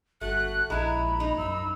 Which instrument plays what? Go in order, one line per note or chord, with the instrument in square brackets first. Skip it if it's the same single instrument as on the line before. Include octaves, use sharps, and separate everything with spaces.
[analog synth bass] G1 [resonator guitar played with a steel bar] A3 [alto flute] F#4 [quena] F#6
[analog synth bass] A#1 [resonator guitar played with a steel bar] G#3 E4 [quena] A#5 [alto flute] B5
[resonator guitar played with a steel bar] D#4
[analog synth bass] F#2 [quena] E6